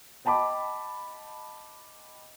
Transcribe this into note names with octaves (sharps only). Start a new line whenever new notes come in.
D#5 G5 A5 B5 D6